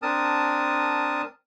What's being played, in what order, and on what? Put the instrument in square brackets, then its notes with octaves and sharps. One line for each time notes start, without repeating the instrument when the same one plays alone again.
[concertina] C4 D4 A#4 A5 D#6